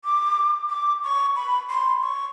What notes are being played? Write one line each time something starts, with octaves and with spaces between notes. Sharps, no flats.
D6
D6
C#6
B5
C6
C#6